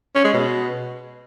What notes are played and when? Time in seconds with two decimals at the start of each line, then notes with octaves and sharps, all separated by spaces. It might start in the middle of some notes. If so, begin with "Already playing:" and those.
0.15 C#4
0.24 G#3
0.34 B2